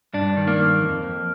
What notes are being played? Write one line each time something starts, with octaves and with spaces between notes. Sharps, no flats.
G2 D4
D#3
A#3
G2
F2
F2